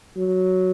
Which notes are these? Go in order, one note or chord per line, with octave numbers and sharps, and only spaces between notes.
F#3